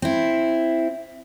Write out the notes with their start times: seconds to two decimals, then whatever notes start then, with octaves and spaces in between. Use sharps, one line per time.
0.02 C4 E4